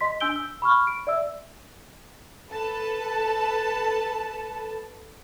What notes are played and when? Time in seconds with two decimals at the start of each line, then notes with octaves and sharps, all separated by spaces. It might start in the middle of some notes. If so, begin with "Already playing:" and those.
0.01 D#5 C6 B6
0.21 D4 G#5 E6 G6 D7 G7
0.36 E6
0.62 B5 C#6 F6
0.87 D7
1.07 D5 E5 E6
2.49 A4 B4 A5